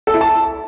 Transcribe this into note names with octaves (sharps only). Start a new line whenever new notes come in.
A4
E4
A5